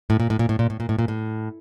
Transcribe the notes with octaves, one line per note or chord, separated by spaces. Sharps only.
A2
A#2
A2
A#2
A2
A#2
A2
A#2
A2
A#2
A2